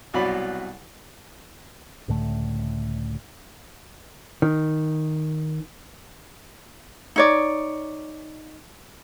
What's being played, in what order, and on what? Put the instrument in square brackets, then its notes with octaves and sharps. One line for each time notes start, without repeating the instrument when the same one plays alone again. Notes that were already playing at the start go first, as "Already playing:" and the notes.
[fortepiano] C2 B2 F#3 F#4 D5 B5
[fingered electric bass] C#2 A2 D3 A3
[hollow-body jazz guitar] D#3
[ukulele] D#4 C#5 D5